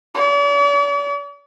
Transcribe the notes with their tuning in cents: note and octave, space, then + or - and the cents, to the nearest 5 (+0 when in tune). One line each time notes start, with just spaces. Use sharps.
D5 -45